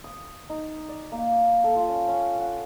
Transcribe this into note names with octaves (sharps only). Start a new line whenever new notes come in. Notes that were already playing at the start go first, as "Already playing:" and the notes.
D#6
D#4
D5
A#3
A4
F4
C#4
C#4
F#5